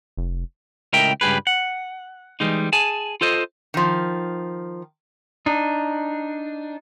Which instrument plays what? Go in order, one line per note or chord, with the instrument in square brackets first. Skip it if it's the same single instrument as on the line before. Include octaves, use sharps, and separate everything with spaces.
[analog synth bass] F1
[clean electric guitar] C#2 A2 A#4 D#5 E5 G5
C#2 G2 G3 G4 G#4 B4
F#5
E3 G3 G#3 D#4
G#4 G#5 A5
F4 A4 C5 D#5
[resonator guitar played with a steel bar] D#3 F3
[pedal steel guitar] D4 D#4